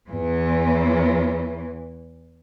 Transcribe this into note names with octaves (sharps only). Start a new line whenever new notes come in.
E2 E3